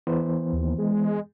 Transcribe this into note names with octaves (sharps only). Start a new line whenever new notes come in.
E3 B3 C5
D#2
G#3